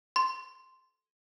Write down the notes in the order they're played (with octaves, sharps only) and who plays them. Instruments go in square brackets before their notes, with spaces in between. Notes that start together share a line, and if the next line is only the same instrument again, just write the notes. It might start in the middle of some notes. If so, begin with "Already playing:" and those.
[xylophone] C6